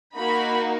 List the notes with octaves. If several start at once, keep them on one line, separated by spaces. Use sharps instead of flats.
A#3 D#4 F#4 B5